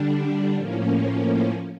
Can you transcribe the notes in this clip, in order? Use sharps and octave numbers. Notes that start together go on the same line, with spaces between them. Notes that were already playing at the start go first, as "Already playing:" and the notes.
Already playing: D3 G3 D4
A2 F3 A#3 C#4